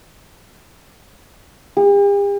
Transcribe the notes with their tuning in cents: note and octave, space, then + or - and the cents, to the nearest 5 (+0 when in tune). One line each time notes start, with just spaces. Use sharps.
G4 +45